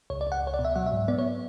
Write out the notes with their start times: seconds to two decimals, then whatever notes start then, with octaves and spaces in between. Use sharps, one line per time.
0.10 C#2 C#5
0.21 D5
0.27 C#2 F#5
0.43 C#2 C#5
0.54 D5
0.59 B2
0.65 E5
0.76 F#3 F#5
0.86 E5
0.92 G#2
1.08 B3 D5
1.18 C#5